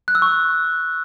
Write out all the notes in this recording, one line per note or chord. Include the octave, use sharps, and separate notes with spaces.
F#6
E6
C#6